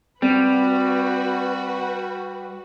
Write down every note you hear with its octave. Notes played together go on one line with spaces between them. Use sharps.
G3 C4 F#4 B4